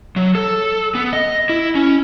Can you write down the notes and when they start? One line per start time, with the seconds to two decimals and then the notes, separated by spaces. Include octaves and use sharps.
0.16 F#3
0.35 A4
0.95 B3
1.13 D#5
1.49 E4
1.75 C#4